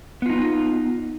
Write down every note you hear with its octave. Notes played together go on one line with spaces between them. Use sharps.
B3 D#4 F4